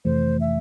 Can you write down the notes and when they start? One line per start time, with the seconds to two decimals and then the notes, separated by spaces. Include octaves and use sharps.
0.05 F2 C3 E3 A3 C5
0.41 E5